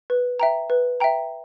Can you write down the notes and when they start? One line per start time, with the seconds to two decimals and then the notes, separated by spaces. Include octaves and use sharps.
0.10 B4
0.40 E5 G5 A#5
0.70 B4
1.00 E5 G5 A#5